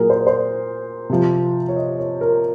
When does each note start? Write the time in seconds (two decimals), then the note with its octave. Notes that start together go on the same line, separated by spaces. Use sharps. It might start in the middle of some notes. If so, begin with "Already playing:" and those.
Already playing: A#2 F#3 G#4 A#4
0.10 C5
0.27 C5
1.10 C3 F3
1.69 C#5
1.76 D#5
1.99 C#5
2.21 A#4